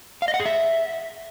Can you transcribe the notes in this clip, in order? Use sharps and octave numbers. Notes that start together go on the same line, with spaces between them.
F5
D#5
F#5
G#4
E5